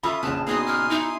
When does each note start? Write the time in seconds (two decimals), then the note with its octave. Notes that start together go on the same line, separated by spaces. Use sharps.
0.03 C#4 F4 A4 E5 B5 D#6
0.23 A#1 C#3 B4 A5
0.47 B3 D#4 F#4 G#4 G#5 C6 D#6
0.66 F6
0.90 D#4 E4